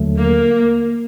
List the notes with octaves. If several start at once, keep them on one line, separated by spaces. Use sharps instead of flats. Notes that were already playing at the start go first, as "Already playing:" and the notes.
Already playing: D#2 D3 F#3 A3
A#3